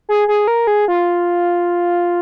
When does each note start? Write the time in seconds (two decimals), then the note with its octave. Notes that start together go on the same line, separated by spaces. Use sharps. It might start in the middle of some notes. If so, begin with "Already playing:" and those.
0.09 G#4
0.28 G#4
0.48 A#4
0.67 G#4
0.88 F4